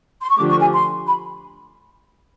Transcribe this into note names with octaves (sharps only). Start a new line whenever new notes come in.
C6
C#6
D3 F3 A3 D4 G4 D6
C#6
G#5
C6
B5